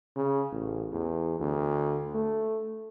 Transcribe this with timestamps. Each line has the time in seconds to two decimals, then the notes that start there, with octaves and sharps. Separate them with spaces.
0.16 C#3
0.52 A1
0.93 E2
1.40 D2
2.15 A3